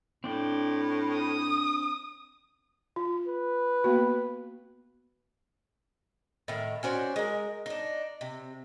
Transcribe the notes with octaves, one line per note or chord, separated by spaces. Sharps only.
A2 C4 D4 G5
D#6
F4
B4
A#3 B3 F#4
A2 D#3
C#4 F#4 C5 D5
G#3 A#4
D4 D#4
C3